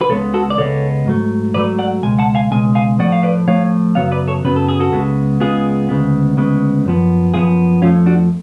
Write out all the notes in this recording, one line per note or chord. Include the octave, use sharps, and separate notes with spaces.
B4
C#2 C#3 G#3 B3 A4 C#5
F#4 A4
D5
C#2 C#3 G#3 B3 A4 C#5
G#2 F#3 A3
G#2 F#3 A3 B4 D5
D5 F#5
C#2 B2 G#3 G#5
F#5 A5
F5 G#5
C#2 B2 G#3 G#5
F5 G#5
A2 F3 A3 D5 F#5
F5
B4 D5
A2 F3 A3 C#5 F5
F#2 C#3 F#3 B3 C#5 F5
B4 D5
A4 C#5
F#2 C#3 F#3 B3 B4
A4
G#4
F#4 A4
C#2 C#3 G#3 B3
C#2 C#3 G#3 B3 F4 G#4
D2 C#3 G#3 B3
D2 C#3 G#3 B3
F#2 F3 B3
F#2 F3 B3 F4 G#4
F2 F3 A3 C#4 F4
D4 F#4